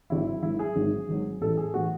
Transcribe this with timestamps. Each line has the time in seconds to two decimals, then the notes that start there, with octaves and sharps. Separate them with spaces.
0.10 G#1 G#2 D#3 F#3 E4
0.42 G#1 G#2 D#3 F#3 E4
0.59 G#4
0.76 G#1 G#2 D#3 F#3
1.09 G#1 G#2 D#3 F#3
1.41 A1 A2 E3 A4
1.57 G#4
1.74 A2 E3 F#4